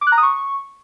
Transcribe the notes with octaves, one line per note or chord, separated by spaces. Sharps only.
D6
F#6
A#5
D#6
C#6